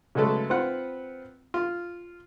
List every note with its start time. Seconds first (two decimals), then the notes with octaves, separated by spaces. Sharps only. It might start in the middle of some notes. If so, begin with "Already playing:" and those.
0.15 C#3 F#3 G#3 A3 A4 B4
0.50 C4 F4 B4 F#5
1.54 F4